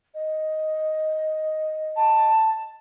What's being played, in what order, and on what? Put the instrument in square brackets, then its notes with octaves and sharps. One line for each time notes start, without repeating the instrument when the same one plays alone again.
[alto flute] D#5
[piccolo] A5